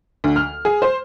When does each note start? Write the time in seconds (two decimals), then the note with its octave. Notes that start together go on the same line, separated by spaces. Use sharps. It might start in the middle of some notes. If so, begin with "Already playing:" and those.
0.24 D2
0.36 F6
0.65 G#4
0.82 C5